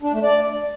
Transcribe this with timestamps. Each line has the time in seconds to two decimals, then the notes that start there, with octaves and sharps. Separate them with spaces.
0.02 D4
0.13 A3
0.23 D5